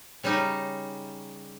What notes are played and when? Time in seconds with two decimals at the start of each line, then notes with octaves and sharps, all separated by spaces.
0.23 C#3 G3 C#4 D#4